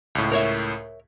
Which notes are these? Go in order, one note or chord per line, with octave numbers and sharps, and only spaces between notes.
C#2 A2
A#4 C#5 E5